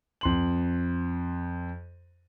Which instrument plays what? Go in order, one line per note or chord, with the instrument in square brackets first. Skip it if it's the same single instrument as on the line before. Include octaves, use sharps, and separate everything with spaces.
[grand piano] F2 C6 F#7